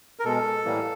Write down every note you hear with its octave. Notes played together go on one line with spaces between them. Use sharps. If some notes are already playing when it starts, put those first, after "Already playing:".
A#4
B2 G#3 A4
A2 E3 G3 A#3